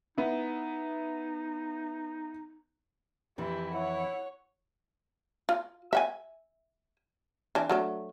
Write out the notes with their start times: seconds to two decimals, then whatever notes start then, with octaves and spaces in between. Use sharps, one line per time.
0.18 B3 D#4 E4
3.38 F2 E3 E4 G4
3.74 E4 C#5 F#5
5.49 F4
5.93 E5 F#5 G#5
7.55 E3 D4
7.69 F#3 A3 D4